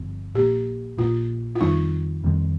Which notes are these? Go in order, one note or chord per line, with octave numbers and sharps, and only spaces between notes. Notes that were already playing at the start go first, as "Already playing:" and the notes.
Already playing: G1 G2 F3 C4
A#1 A#2 A#3 G4
A#1 A#2 A#3 F4
F4
F2 D#3 G3 C4 D#4
F2 D#3 G3 C4